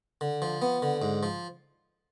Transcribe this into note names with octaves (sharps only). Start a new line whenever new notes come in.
D3
F3
B3
D3
G#2
F3